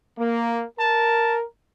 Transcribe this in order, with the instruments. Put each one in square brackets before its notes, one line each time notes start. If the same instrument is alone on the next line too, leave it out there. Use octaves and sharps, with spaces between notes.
[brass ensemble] A#3
[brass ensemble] A#4 [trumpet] A5